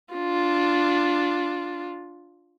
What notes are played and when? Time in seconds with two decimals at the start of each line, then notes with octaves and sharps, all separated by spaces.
0.14 D4 F4